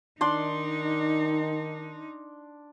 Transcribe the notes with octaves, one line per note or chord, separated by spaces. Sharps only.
D#3 D4 D#4 D5 C6